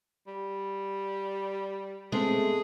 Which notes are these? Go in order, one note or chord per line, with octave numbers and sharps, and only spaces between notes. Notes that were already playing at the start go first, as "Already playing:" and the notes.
G3
G#3 A3 B3 C4 G#4 A4